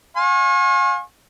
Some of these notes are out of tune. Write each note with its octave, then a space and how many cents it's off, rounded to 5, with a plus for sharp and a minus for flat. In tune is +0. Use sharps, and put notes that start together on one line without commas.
F5 +35 G#5 +0 C#6 -40